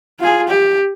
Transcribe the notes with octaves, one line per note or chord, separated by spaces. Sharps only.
F4 G#4
G4